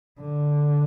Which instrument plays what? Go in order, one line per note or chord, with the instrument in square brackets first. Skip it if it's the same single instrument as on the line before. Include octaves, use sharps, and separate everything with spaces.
[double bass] D3